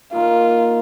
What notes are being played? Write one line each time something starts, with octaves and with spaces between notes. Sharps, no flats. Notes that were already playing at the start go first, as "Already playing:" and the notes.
A#2 D#3 A#3 F4